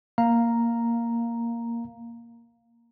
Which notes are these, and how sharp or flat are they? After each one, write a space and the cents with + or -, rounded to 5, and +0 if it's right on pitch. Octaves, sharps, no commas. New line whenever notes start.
A#3 +0 F5 +0 A#5 +0